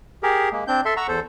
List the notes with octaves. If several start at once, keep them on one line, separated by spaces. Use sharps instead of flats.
G4 G#4 A#4
G#3 A#3
C4 D4 G6
A4 E5 C6
F#5 A#5 C#6 E6
E2 A4 C5